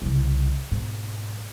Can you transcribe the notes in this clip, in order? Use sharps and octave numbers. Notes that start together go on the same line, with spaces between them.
C2 C#3
G#2 B2